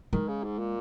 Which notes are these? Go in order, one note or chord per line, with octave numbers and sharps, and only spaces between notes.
D#3 G#3
C#3
G#2
A#2